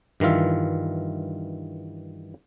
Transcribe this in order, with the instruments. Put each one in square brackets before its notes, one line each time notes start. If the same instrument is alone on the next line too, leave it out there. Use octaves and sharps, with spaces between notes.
[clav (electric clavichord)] G2 D#3 E3 F4 E5